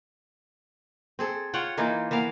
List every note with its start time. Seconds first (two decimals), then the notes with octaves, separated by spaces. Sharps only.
1.19 C4 G#4 A4
1.54 F4 C#5 F#5 G5
1.77 E3 A#3 D#4 F4
2.11 E3 A#3 B3 F5